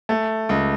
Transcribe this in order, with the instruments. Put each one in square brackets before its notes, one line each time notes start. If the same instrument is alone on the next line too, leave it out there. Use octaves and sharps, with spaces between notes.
[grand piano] A3
C#2